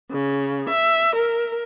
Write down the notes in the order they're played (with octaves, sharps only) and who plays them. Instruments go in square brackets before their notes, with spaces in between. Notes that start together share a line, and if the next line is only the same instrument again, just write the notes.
[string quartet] C#3
E5
A#4